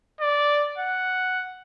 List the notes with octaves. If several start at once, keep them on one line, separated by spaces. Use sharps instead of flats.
D5
F#5